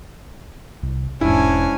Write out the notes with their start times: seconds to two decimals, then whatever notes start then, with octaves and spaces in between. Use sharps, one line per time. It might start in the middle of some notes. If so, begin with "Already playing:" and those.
0.83 C2
1.21 E1 G#2 C#4 D4 E4 G#5